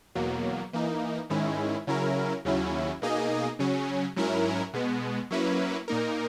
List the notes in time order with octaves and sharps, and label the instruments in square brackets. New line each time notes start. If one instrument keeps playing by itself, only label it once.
[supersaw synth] E2 B2 F#3 A#3
E3 A#3 D#4
G#2 D#3 G#3 C#4 E4
C#3 F#3 C#4 E4 A#4
D#2 C#3 F#3 C#4 E4
B2 A#3 D#4 G#4 D#5
C#3 F#3 C#4
G#2 F#3 C#4 E4 A#4
B2 G#3 B3
F#3 A#3 C#4 E4 B4
A#2 A#3 D#4 A#4